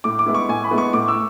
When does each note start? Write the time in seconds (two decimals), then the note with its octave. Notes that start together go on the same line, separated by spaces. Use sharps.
0.04 A2 D6
0.19 D6
0.26 G#3 B3 E4
0.35 C#6
0.49 A2 G#5
0.64 B5
0.71 G#3 B3 E4
0.78 C#6
0.93 A2 D6
1.08 E6